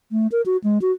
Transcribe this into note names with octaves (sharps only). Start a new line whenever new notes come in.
A3
A#4
F#4
G#3
F#4